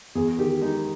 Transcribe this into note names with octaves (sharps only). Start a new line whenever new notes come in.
E2 G#4
D#3 G4
G#3 D#4